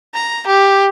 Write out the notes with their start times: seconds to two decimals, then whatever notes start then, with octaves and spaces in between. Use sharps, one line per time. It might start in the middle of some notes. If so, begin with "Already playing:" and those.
0.15 A#5
0.47 G4